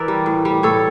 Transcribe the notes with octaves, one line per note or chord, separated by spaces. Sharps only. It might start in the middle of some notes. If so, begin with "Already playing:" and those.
Already playing: E3 A#4 D5 E5
G3
A2
G3
A2 A4 C#5